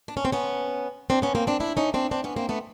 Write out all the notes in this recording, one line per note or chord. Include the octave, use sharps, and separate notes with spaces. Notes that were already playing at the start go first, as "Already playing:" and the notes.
D4
C#4
C4
B3 C#4
C4 D4
B3 C#4
A#3 C4
C4 D4
D4 E4
C#4 D#4
C4 D4
C4 D4
B3 C#4
A#3 C4
A3 B3